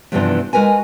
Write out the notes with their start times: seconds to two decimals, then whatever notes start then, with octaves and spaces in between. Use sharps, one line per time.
0.12 E2 G2 C3 E3 F3 D4
0.53 G#3 F#4 A#4 B4 G#5